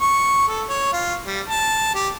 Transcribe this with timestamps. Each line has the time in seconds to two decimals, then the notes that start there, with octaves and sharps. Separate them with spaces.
0.01 C#6
0.48 A4
0.68 C#5
0.93 F4
1.26 G3
1.49 A5
1.95 G4